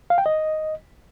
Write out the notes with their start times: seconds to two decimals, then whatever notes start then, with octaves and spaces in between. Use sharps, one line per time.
0.10 F5
0.18 G5
0.26 D#5